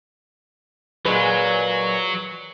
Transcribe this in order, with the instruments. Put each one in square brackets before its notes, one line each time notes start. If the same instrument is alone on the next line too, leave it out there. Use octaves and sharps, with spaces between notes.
[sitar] A#2 G#3 B4 [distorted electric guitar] F#3